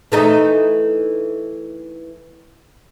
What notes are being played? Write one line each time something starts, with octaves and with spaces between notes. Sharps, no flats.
E3 A3 D#4